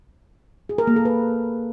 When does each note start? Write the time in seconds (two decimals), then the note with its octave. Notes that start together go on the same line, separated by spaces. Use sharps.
0.69 G#4
0.78 A#4
0.87 A#3
0.96 A4
1.05 B4